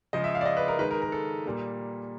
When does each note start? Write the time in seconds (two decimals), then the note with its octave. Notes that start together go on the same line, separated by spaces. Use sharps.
0.13 C#3 F3 G#3 D#5
0.24 E5
0.35 F5
0.41 D5
0.46 D#5
0.57 B4
0.68 A#4
0.79 D#3 G#3 B4
0.91 A#4
1.02 A#4
1.12 A4
1.45 A#2 G3 A#3